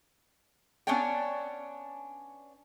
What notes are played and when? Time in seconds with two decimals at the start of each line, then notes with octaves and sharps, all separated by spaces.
0.87 B3 C#4 D4 C#5 D5 G5